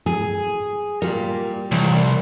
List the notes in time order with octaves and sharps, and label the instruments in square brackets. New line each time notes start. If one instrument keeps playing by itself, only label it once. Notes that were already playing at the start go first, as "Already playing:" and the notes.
[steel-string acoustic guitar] G#4
[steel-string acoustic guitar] G3 [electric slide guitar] F4 A#4
[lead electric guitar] C2 [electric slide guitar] E3 C#5